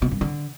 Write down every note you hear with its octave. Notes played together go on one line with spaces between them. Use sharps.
B2
G2
D3